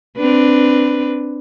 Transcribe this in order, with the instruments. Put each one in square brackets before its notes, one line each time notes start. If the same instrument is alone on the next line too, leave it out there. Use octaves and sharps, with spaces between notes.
[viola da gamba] C4 D4 B4